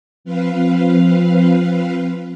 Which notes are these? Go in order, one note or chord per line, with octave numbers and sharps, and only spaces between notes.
F3 C4 B4 F5